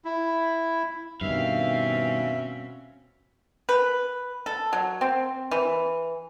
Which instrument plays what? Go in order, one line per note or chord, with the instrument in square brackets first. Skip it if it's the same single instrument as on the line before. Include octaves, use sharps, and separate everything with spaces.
[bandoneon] E4
[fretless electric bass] G2 D#3 [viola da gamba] B2 C4 C#4 [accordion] E5 [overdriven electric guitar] F5
[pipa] B4
A4
F#3
C4
E3